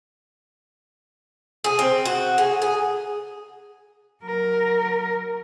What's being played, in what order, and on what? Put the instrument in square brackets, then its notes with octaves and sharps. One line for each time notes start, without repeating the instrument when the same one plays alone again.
[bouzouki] G#4
C4
F#4
G#4
G#4
[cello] F#3 A#4